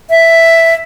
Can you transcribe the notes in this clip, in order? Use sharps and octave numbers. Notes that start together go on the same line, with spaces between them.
E5